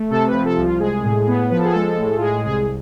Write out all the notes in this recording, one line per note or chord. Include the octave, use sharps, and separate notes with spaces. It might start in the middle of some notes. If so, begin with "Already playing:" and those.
Already playing: A3
C3 A4
B4
F3
A4
C2
F4
G#3 G#4
A2
B3
F3 B4
A4
G#4
G#3 A4
A2
F4
G#3 G#4
C2 G#4